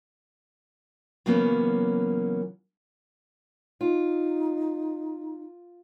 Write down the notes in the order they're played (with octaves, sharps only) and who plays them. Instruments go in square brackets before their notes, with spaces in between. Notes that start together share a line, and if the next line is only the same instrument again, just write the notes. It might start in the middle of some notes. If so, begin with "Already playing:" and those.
[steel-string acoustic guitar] C#3 E3 F#3 A#3 B3 C#4
[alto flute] D#4 [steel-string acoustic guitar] F4